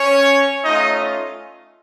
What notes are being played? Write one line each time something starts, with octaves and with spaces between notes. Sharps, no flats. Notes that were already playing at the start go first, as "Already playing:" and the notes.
Already playing: C#4 C#5
A3 C#4 D#4 F4 D#5